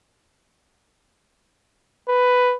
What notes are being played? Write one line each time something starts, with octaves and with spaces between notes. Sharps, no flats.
B4